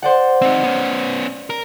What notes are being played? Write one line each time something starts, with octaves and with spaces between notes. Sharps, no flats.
C5 D5 F#5
C4 D#4
B3 C#4
A#4